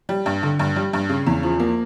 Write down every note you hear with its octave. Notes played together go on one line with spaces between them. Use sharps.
G3
G2
D3
G2
G3
G2
C#3
E2
F3
A#3